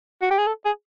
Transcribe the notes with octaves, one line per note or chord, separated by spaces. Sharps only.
F#4
G4
G#4
A4
G#4